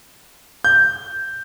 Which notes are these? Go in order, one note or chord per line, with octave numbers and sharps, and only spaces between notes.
G6